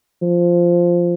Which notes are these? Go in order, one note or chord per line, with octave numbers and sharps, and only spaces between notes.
F3